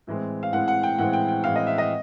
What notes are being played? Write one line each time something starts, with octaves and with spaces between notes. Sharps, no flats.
A2 E3 G#3 C4
F5
A2 E3 G#3 C4 F#5
F#5
G5
A2 E3 G#3 C4 F#5
G5
G5
A2 E3 G#3 C4 F5
D#5
E5
D#5